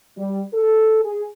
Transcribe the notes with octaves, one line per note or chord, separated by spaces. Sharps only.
G3
A4
G#4